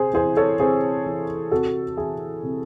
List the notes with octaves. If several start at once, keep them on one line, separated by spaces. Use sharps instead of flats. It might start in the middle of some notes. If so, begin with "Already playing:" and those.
Already playing: C3 G#4 C5
E3 G#4 C5
A4 C#5
C3 G#4 C5
E3
C3 F#4 A4
E3 E4 G#4
C3